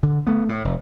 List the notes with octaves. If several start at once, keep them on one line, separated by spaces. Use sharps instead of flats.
D3
A3 B3
A2
F1